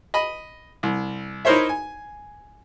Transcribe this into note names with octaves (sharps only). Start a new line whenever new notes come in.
D#5 B5
C2
D#4 E4 A#4 C5 C#5 E5
G#5